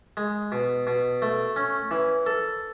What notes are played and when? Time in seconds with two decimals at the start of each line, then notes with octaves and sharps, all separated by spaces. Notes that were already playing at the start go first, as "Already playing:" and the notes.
0.17 G#3
0.52 B2
0.87 B2
1.22 A3
1.56 C#4
1.91 E3
2.26 A4